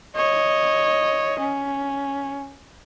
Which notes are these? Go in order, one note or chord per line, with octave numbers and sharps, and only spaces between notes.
C#5 D#5
C#4